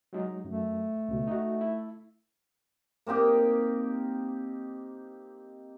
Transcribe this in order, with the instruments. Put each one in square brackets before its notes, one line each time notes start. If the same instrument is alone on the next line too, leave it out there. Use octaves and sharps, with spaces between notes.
[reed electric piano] F#3 G#3 D#4
[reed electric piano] F#2 [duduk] A3
[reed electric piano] C#2 B2
D#4 F#4
E4
[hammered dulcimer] A#3 C4 D#4 G4